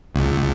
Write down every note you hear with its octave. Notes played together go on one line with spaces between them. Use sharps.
C#2